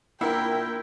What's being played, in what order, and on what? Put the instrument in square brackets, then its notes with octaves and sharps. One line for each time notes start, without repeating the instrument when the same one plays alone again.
[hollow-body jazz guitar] A#2 D4 F#5 [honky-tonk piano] E4 A#4 [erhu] G5